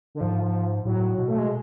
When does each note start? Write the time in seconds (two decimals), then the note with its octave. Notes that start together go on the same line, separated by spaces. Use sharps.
0.15 D3
0.21 G#2 F3
0.42 F3
0.85 A2 F#3
1.18 B2
1.28 A3
1.38 G#3